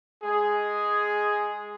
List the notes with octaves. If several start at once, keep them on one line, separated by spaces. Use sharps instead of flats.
G#3 G#4